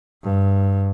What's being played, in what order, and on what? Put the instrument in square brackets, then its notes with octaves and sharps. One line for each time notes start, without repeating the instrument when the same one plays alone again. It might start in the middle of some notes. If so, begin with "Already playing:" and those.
[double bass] G2